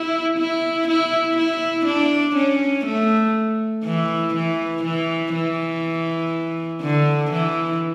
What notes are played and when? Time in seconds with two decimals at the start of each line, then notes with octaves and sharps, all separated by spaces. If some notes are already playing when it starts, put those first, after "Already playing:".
Already playing: E4
0.38 E4
0.88 E4
1.37 E4
1.86 D4
2.37 C#4
2.86 A3
3.85 E3
4.35 E3
4.83 E3
5.34 E3
6.82 D3
7.32 E3